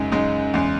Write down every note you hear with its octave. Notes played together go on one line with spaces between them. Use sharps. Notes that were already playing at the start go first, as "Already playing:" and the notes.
Already playing: F#2 C#3 G#3 D#4
F#2 C#3 G#3 D#4
E2 C#3 G#3